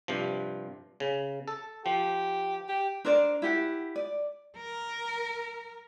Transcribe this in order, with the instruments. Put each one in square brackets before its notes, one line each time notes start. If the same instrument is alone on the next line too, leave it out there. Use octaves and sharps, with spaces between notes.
[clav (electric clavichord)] G2 C3 F3
C#3
A4
[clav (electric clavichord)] F3 [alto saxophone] G4
[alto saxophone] G4
[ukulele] D4 A#4 C5 D5
E4 G4 F#5
D5
[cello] A#4